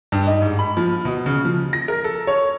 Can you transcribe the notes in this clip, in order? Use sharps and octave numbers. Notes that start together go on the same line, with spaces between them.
G2
D#4
G#2
B5
F3
B2
C#3
F3
A#6
A#4
A4
C#5